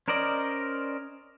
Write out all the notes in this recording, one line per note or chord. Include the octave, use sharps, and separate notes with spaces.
C#4 A#4 C5 D5 D#5